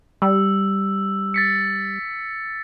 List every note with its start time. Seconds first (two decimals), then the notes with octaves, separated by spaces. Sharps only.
0.22 G3 E6
1.34 A6 B6 C#7